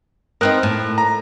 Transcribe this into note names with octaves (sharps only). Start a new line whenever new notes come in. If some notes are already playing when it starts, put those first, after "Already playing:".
B3 C4 D#4 A#4 F#6
A2
A#5